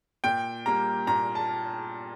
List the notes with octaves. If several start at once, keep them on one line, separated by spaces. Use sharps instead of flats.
A#2 G5
G3 A#3 A#5
A#2 A#5
A5